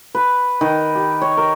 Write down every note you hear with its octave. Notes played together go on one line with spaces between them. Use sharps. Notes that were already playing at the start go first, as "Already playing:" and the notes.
B4
D#3
G4
C#5
A#4